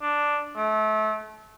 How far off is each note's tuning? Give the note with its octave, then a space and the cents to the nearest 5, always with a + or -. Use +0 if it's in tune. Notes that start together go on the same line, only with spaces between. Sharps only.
D4 +0
A3 -30